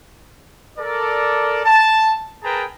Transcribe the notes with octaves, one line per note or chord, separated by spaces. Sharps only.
A4 A#4 D5
A5
G#4 A#4 B4 G5 A5 A#5